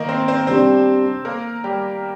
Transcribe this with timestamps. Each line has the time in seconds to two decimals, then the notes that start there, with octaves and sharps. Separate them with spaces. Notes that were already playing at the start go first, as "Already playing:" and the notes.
Already playing: D#3 A#3 D#4 A#4
0.09 C4 C5
0.28 C4 C5
0.47 C3 G3 C4 D4 C5
1.25 A#3 A#4
1.64 G3 G4